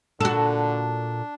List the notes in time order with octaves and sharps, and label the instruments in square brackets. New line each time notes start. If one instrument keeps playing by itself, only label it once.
[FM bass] A#2 [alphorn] D3 [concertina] D4 [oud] F#4 A4